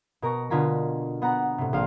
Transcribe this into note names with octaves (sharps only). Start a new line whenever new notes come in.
B2 A#4 A#5 C#6 A#6
B2 D3 F4 G#5 A#5 B6
B3 F#5 A#5
A2 C3
A#1 C5 F5